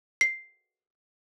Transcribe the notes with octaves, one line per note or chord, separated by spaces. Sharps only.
C7